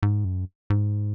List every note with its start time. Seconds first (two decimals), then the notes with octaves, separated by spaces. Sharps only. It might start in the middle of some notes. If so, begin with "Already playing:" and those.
0.03 G#2
0.25 F#2
0.70 G#2